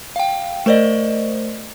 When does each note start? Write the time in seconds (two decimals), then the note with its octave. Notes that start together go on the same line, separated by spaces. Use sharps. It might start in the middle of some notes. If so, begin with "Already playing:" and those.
0.16 F5 G5
0.66 A3 A#4 C5 D5 D#5